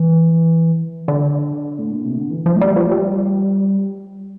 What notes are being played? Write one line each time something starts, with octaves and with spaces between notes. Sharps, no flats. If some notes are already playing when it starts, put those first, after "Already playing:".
Already playing: E3
D3
A2
A#2
C3
D3
E3
F3
A3
G3
F3
G3